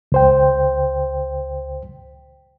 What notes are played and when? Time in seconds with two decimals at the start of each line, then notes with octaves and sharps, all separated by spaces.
0.12 C#2 C5 G5